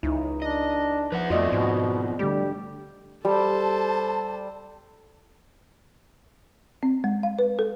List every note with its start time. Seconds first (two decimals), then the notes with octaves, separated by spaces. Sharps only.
0.03 C#2 D#4 E4
0.42 D4 D#5
1.12 F3 B4 E5 F#5
1.30 F2 A3 B3 C4 F4 F#4 D5 D#5
1.52 G#2 B2
2.19 D3 G3 A3 G4
3.25 G3 A4 C5 A5
6.83 C4
7.04 G#3
7.23 F5
7.39 B4
7.59 A4